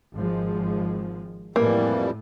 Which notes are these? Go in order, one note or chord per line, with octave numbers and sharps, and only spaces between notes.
G#1 F3 G#3
F2 A2 E3 G3 A#3